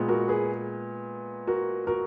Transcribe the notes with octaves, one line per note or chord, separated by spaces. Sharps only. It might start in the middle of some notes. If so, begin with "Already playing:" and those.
Already playing: A#2 G#3 B3
F#4 A#4
G#4 B4
F#4 A#4
F#4 A#4